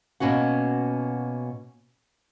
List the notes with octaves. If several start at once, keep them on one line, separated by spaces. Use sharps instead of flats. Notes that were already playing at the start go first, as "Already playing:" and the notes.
B2 A#3 C#4 F#4 F#5